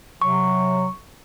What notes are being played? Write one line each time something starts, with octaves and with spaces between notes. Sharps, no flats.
C3 F#3 C#6